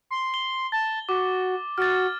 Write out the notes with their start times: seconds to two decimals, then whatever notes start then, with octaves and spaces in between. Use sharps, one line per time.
0.11 C6
0.34 G7
0.72 A5 A6
1.09 F#4 D6
1.78 F#4 F6 A6